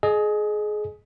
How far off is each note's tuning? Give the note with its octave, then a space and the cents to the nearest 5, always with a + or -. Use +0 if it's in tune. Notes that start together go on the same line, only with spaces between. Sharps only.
G#4 +25 D#5 -20